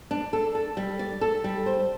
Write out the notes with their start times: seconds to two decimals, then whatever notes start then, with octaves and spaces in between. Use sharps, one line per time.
0.11 D4
0.33 A4
0.55 A4
0.77 G3
0.99 D5
1.21 A4
1.44 G3
1.66 C5